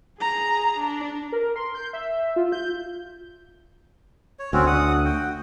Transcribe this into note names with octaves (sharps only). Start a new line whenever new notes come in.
G#4 A#5
D4
A#4
C6
G6
E5
F4
G6
C#5
D2 C4 C#4 F#4
F#5 D#6
F#4 G5